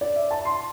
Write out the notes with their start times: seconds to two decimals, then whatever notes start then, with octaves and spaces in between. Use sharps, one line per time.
0.01 D5
0.16 E5
0.31 A5
0.45 C6